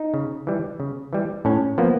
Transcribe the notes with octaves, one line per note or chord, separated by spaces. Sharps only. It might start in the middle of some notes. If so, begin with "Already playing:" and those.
Already playing: D#4
C#3
E3 G3
C#3
E3 G3
A2 C#4
F3 A#3 B3